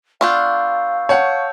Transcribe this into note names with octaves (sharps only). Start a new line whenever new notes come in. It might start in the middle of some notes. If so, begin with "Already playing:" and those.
B3 D4 F4 F5 C#6 E6 G6
C#5 F#5 A5 G6